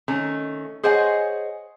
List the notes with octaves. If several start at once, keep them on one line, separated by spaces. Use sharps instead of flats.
D#3 A3 C#4
G#4 C5 C#5 D#5 F#5 G#5